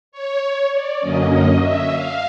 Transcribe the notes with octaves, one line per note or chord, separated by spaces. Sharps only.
C#5
D5
F#2 D3 F#3 A#3 C#4 D#5
D#5
E5
F5